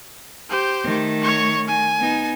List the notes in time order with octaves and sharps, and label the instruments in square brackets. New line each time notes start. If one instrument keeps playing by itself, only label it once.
[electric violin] G4 C5
[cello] D#3 A3
[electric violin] C#5 C#6
G#5
[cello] B3 D#4